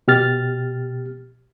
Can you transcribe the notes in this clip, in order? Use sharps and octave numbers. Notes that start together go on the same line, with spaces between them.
B2 G4 F6 A6